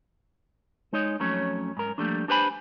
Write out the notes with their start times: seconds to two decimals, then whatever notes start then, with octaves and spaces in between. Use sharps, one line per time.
0.93 G#3 D#4 C#5 D#5
1.20 F2 F#3 A3 C#4 C#5
1.77 G#2 A#4
1.98 F3 G3 A3 A#3 D4
2.28 D4 G4 B4 C5 G#5 B5